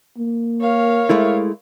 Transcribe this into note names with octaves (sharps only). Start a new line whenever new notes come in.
A#3
A#4 C#5 F5
G#3 A3 E4